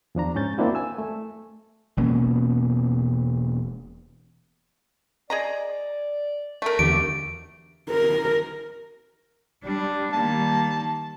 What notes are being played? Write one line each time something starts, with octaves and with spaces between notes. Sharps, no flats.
E2 F3 D4 A#5
G#2 C#4 G6 A6
A#3 C4 D4 E4 F#4
G#5 E6
A3
E1 B2 A#3 C#4
G#4 D5 D#5 A#5
A3 A#4
E2 D3 G4 D7
A#4
G3 D4
D#3 A#3 A5